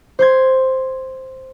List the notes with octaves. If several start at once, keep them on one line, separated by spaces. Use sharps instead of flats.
C5 C6 G#6